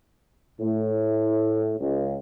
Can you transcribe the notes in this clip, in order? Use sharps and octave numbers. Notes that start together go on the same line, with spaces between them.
A2
C#2